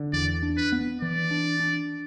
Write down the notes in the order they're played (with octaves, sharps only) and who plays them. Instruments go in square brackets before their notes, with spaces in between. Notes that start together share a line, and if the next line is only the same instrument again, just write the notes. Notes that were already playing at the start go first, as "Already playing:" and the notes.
Already playing: [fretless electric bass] D3
[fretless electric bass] E2 [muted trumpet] D5
[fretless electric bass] D4
[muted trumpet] B4
[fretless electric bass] B3
[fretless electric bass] E3 [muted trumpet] D5
[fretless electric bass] D4
D4